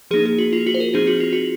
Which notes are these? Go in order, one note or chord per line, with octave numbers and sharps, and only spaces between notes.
F3 A#3 D#4 G#4
G#4
F#4
F4
F#4
C5
A#4
F3 C4 D#4 G#4
F#4
F4
F#4